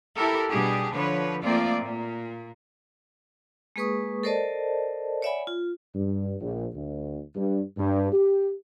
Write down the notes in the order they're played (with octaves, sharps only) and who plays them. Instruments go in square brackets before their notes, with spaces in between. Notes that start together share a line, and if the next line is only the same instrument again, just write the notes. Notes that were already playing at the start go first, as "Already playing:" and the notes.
[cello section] E4 G4 A4 A#4
B2 G3 D4 G4 G#4
D3 F3 B4 C#5
F3 A3 A#3 C4 F4 D5
A#2
[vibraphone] G#3 A#3 G#4 B4 C#6 D#6
A4 A#4 C5 D5 D#5 A5
C#5 D5 E5 F#5 G#5 B5
F4
[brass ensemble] G2
A#1
D2
G2
G2
G4